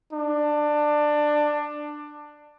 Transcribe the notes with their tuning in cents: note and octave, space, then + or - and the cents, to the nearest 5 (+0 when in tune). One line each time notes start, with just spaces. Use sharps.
D4 +15